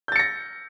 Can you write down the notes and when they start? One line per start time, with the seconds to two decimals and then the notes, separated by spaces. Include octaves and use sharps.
0.08 G6
0.12 A6
0.16 C#7
0.19 A#6